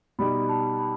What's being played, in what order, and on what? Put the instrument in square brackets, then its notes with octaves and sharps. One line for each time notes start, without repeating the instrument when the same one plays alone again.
[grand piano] B2 G3 D#4 G4 [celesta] B5
[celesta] A5
B5